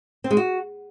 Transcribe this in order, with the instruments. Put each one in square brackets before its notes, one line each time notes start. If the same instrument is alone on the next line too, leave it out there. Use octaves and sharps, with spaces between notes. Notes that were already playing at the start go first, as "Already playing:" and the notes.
[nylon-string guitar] C4
G#3
F#4